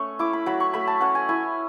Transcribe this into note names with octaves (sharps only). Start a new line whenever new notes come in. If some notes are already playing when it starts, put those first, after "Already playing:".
Already playing: A3 C#4 C#6
E4 D6
B5
F#3 B5
C#6
A3 B5
A5
C#4 F#5
G#5
E4 G#5